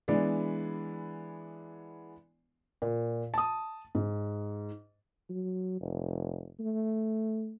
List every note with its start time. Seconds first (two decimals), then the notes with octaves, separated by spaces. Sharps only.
0.08 E3 G#3 B3 D4 D5
2.82 A#2
3.34 A5 D#6
3.95 G#2
5.30 F#3
5.81 F1
6.60 A3